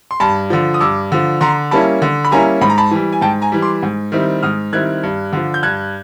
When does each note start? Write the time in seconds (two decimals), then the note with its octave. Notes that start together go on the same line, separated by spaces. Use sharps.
0.11 C6
0.20 G2 A5 B5
0.50 D3 F3
0.74 D#6
0.80 G2 D6 E6
1.12 D3 F3
1.41 D3 A#5 C6
1.71 G3 A#3 C#4 E4 A5 B5
2.02 D3
2.25 B5
2.31 G3 A#3 C#4 E4 G#5 A#5
2.61 G#2 B5
2.70 A#5
2.78 A5 B5
2.91 E3 G3
3.12 G#5
3.21 G#2 G5 A5
3.42 G#5 A#5
3.52 E3 G3
3.62 C6 D6
3.83 G#2
4.12 D#3 G3 C4 E4
4.43 G#2 D#6 F6
4.73 D#3 G3 C4 E4 F#6 G#6
5.03 G2
5.33 D3 F3
5.54 G6
5.63 G2 F#6 G#6